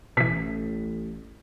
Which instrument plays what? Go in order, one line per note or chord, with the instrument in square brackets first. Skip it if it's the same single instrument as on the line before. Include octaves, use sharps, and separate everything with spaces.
[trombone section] A1 [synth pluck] B2 E3 [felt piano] B6